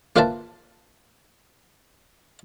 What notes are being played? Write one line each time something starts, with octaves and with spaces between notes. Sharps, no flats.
A#3 F4 B4 C5 E5 A5